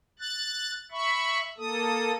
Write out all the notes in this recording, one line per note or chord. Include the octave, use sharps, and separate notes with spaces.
F#6 A6
E5 B5 C#6
A#3 A4 D#6